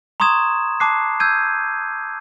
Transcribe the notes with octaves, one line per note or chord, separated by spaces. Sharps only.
A#5 C6 C#6 D#6 G#6 E7
A5 D6 F#6 C7
E6 G6 G#6 D#7